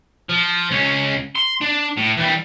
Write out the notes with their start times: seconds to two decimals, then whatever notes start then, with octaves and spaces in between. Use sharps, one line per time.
0.29 F3
0.71 C#2 C#4
1.35 C6
1.61 D4
1.97 A2
2.17 E3 G3